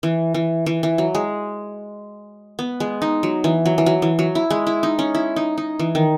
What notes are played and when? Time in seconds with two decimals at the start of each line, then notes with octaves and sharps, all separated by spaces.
0.03 E3
0.34 E3
0.66 E3
0.83 E3
0.98 F#3
1.15 G#3
2.59 B3
2.80 G#3
3.02 D#4
3.23 F#3
3.44 E3
3.66 F#3
3.78 E3
3.86 F#3
4.02 E3
4.19 F#3
4.35 E4
4.50 G#3
4.67 E4
4.83 D#4
4.99 C#4
5.15 E4
5.36 D#4
5.58 D#4
5.79 E3
5.95 D#3